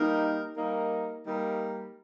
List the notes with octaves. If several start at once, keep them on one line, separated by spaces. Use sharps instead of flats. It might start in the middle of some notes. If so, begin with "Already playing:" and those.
Already playing: G3 A#3 D#4 A#4
G3 A#3 D#4 A#4
G3 A#3 D#4 A#4